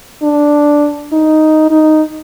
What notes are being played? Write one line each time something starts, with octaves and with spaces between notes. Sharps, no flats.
D4
D#4
D#4